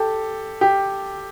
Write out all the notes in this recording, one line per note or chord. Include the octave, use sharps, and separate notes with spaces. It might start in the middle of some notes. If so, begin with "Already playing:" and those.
Already playing: G4 A4
G4